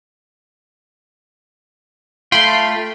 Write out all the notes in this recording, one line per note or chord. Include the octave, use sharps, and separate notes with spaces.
A3 F4 G5 B5 C6